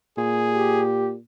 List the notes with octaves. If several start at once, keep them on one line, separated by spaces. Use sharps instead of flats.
A#2 G#4
G4